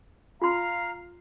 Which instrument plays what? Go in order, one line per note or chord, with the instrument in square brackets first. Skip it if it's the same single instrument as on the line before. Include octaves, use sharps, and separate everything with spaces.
[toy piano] F4 C6 [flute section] F5 A#5 F6